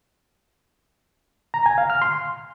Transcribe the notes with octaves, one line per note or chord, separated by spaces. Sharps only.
A#5
G#5
F5
F6
C6